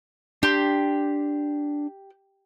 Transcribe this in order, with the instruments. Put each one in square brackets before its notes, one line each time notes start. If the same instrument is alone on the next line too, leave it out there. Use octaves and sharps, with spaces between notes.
[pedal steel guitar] D4 C6 [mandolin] G4